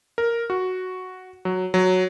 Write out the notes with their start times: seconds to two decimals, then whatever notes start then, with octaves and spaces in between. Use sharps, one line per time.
0.18 A#4
0.50 F#4
1.45 F#3
1.74 F#3